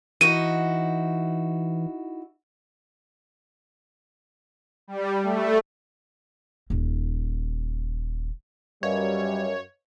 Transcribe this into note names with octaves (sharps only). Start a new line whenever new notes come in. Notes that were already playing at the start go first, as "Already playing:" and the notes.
E3 D#4 E4 F#4 D#7
G3
A3
D#1 D#4
F#2 G3 B4 C#5 D#5 F5